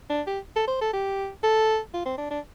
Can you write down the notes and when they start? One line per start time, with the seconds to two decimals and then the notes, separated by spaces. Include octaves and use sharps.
0.10 D4
0.27 G4
0.56 A4
0.68 C5
0.81 A4
0.94 G4
1.43 A4
1.94 F4
2.06 C4
2.18 D4
2.31 D4